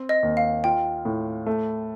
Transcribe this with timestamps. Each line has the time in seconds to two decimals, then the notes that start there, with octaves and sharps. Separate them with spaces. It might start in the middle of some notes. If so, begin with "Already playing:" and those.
Already playing: C4
0.09 D#5
0.23 D#2
0.37 F5
0.64 F4 G5
1.05 A2
1.46 A3